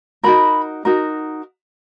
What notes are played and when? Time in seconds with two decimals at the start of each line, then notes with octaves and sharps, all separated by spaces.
0.23 D#4 F#4 A#4 B5
0.85 D#4 F#4 A#4